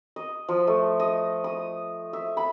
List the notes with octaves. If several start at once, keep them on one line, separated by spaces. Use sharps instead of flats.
D#5
F3
A3
D#5
D#6
E5
B5